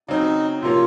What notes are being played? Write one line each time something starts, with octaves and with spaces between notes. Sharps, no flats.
C#3 F#3 C4 D#4
C3 F3 A#3 C#4 F4